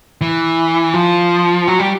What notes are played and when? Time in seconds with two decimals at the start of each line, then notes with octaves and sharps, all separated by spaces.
0.21 E3
0.94 F3
1.67 F#3
1.79 G3